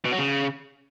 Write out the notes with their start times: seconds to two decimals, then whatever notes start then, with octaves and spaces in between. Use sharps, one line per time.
0.05 B2
0.12 F#3
0.19 C#3